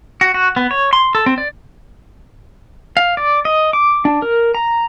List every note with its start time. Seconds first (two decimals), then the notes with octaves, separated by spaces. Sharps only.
0.21 F#4
0.34 F#4
0.56 B3
0.71 C#5
0.93 C6
1.15 A4
1.26 C4
1.38 D5
2.97 F5
3.17 D5
3.45 D#5
3.73 D6
4.05 D4
4.22 A#4
4.55 A#5